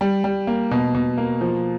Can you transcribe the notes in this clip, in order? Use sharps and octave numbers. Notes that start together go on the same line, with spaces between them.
G3
G3
A#3
B2
B2
A#3
F3